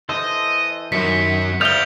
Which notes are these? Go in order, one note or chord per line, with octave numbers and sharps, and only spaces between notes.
E3 A4 C5 D#5
F#2 D#3 B6 C#7
D5 E5 F5 D#6 F6 G6 F7 G7